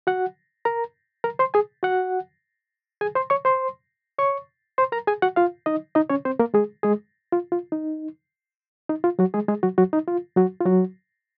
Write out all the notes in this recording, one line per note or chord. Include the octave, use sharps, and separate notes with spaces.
F#4 F#5
A#4 A#5
A#4 A#5
C5 C6
G#4 G#5
F#4 F#5
G#4 G#5
C5 C6
C#5 C#6
C5 C6
C#5 C#6
C5 C6
A#4 A#5
G#4 G#5
F#4 F#5
F4 F5
D#4 D#5
D#4 D#5
C#4 C#5
C4 C5
A#3 A#4
G#3 G#4
G#3 G#4
F4
F4
D#4
D#4
F4
F#3 F#4
G#3 G#4
G#3 G#4
F#3 F#4
F#3 F#4
D#4
F4
F#3 F#4
F4
F#3 F#4